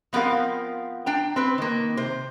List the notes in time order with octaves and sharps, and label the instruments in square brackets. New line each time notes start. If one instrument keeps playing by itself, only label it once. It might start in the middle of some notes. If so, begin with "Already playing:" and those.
[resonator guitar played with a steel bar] F3 B3 C4 A#4 F5
D4 G5 A#5
C4 B4
D#3 A#3
C3 C5